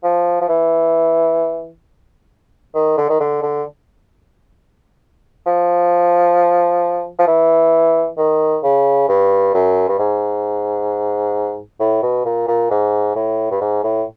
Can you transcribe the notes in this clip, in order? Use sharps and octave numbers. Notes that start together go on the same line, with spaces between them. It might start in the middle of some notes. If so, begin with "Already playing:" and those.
F3
F3
E3
D#3
D3
D#3
D3
D3
F3
F3
E3
D#3
C#3
G2
F#2
G2
G#2
A2
B2
A#2
A#2
G#2
A2
G2
G#2
A2